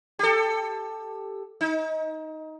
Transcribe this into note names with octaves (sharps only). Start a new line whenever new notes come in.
G4 A4
D#4